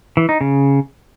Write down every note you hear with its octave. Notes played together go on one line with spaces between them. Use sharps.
E3
D#4
C#3